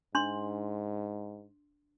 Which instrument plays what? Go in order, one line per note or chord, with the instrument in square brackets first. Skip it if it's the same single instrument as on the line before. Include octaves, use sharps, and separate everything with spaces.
[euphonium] G#2 [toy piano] D4 C6